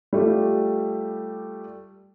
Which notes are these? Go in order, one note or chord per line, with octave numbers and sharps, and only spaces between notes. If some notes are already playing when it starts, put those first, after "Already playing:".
G3 A3 F4 G4